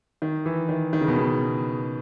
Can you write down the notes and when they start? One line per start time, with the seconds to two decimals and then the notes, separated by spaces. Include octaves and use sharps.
0.22 D#3
0.46 E3
0.69 D#3
0.93 D#3
1.01 C#3
1.08 B2
1.16 C#3